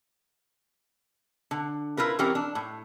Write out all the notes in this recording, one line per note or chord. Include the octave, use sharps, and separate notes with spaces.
D3
E4 F4 A#4 B4
E3 C4 C#4 G4 A#4
D4
A2